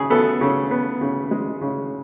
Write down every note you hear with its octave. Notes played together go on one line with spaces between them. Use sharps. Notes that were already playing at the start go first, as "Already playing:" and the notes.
Already playing: C#3 G#4
B3 A4
C#3
B3
C#3
G#3
C#3